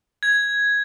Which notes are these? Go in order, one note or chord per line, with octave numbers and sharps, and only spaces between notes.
G#6